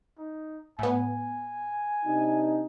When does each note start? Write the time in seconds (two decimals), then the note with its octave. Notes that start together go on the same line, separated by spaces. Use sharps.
0.19 D#4
0.79 A2 B3 G#5
2.05 C3 D4 D#4